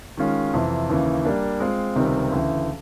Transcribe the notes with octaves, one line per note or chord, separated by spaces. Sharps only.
D#3 G#3 C#4 F4
F2 C3 E3
D#2 C#3 E3
G3 A#3 D4
G#3 C4 F4
C#2 C3 D#3 G3 C4
D2 C#3 E3